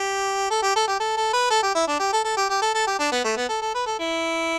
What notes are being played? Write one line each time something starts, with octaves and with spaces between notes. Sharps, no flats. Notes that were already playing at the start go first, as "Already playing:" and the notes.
Already playing: G4
A4
G4
A4
G4
A4
A4
B4
A4
G4
E4
D4
G4
A4
A4
G4
G4
A4
A4
G4
D4
B3
A3
B3
A4
A4
B4
A4
E4